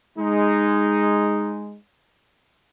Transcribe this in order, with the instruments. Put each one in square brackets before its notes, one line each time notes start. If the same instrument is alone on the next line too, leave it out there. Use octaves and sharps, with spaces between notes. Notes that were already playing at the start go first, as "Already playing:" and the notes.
[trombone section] G#3 D#4